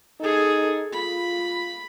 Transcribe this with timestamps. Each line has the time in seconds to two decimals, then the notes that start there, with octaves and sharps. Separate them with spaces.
0.20 D#4 G#4 A4
0.93 F4 B5